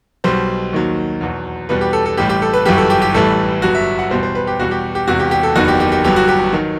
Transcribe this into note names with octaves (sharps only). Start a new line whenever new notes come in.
B1 B2 G3 C5
D#2 D#3 F#3
E2 B2 F#3
E2 B2 G3 B4
G4
A4
A4
A1 A2 G3 G4
G4
A4
B4
G1 F#2 E3 G3 G4
A4
G4
G4
A1 A2 E3 G3 A4
G1 G2 F#3 F#4
E5
F#5
E2 B2 G3 C5
C5
B4
G4
E2 B2 G3 F#4
G4
G4
E1 E2 C3 F#4
G4
G4
A4
F#1 E2 D#3 F#4
G4
G4
G4
G1 G2 F#3 G4
F#4
G4
D#3 F#3